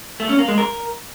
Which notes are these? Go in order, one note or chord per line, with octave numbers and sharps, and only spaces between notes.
A3
C#4
A#3
G#3
A#4